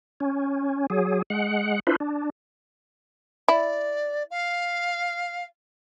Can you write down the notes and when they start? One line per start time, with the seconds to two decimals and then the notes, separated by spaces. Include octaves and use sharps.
0.20 C#4
0.90 F#3 G#4
1.30 G#3 F#5
1.87 D4 E4 F4 B4 C5
2.00 D4
3.48 E4 D5
4.30 F5